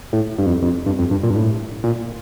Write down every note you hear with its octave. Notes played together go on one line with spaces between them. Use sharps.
A2
G2
F2
F2
G2
F2
G2
A#2
G2
A2
A#2